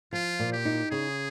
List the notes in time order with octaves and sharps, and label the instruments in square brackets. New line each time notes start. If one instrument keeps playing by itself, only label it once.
[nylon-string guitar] F3 [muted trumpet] F4
[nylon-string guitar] A#2
[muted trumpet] G4
[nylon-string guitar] D#4
[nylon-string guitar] C#3 [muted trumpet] G#4